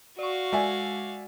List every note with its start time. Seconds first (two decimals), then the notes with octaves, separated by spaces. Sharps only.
0.19 F#4 D5 F5 C#6
0.53 G#3 D5 E5 G#5